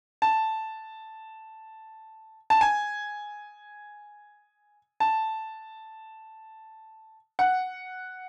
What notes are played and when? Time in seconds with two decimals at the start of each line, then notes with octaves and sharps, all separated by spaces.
0.22 A5
2.50 A5
2.61 G#5
5.00 A5
7.39 F#5